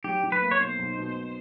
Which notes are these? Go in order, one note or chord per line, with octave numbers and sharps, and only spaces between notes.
F#3 G4
F#3
B4
A#3
C#5
B2 C5
B1
B2